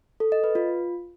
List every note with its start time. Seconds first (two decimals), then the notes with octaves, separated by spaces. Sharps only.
0.20 A4
0.32 D#5
0.44 B4
0.55 F4